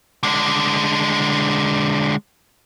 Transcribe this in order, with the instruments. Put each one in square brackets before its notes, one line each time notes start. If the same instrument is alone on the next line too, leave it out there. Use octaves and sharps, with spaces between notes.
[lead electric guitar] D3 G#3